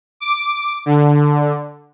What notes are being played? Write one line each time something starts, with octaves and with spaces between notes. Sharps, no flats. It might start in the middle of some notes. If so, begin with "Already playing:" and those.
D6
D3